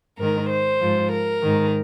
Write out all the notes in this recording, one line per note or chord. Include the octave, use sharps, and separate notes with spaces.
G#2 D#3 A#4
C5
G#2 F3
A#4
G#2 D#3